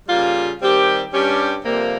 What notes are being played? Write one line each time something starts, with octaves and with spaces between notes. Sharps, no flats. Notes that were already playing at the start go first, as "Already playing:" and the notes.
C#3 G3 A#3 F4
D#3 G3 C4 G4
G2 G3 C#4 G4
F2 C3 G3 A#3